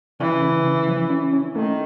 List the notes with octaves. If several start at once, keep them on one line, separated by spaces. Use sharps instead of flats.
C#3 E3
C#3
C#3
F3
C#4
C#4
D#3 A3